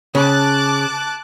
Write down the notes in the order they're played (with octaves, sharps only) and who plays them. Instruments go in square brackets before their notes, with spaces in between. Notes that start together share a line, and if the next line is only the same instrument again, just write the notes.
[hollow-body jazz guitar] C#3 [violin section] A5 D6 F#6